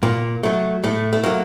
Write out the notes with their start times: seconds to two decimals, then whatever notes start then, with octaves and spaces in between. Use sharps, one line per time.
0.03 A#2 A#3
0.43 F#3 A3
0.84 A2 A3
1.13 A3
1.23 F#3 A3 A#3